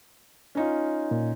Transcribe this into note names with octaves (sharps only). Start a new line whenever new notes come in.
C#4 D#4 F4
A#2